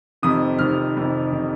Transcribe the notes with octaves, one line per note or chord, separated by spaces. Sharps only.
F1 F2 C3 D#3 D#6
F1 F2 C3 D#3 F6
F1 F2 C3 D#3
C3 D#3